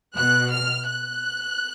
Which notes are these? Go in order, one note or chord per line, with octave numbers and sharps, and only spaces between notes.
B2 F#6
F6
F#6